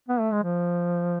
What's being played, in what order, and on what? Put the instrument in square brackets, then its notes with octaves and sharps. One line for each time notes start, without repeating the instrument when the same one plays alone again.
[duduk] B3
A3
G#3
F3